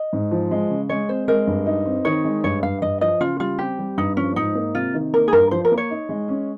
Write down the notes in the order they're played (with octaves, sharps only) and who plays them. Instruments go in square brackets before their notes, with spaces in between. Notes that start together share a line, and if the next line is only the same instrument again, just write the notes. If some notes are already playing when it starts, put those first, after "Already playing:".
Already playing: [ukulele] D#5
[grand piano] G#2
F3
G#3
C#3
[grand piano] G#3 [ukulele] C#5
[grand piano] C4 [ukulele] C5
[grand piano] G#3 [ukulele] A#4
[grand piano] G2
D#4
C4
[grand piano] D#3 [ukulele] C#5
[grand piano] G#3
[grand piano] G2 [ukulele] C#5
[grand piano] G2 [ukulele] F5
[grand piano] G2 [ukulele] D#5
[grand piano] F3 [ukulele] D#5
[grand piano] C#3 [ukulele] F4
[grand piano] G3 [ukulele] F4
[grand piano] C4 [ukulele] G4
[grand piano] G3
[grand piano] G2 [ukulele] D#4
[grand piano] F3 [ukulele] C#4
[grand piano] G#2 [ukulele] D#4
[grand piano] A#3
[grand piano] C3 [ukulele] F4
[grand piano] D#3
[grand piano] A#3 [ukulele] A#4
[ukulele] G#4
[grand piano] G2 [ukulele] A#4
[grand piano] F3 [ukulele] C5
[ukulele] A#4
[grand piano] A#3
[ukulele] C#5
[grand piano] D#4
G#3
C#4